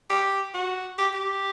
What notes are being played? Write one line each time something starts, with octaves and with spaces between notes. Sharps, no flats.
G4
F#4
G4
G4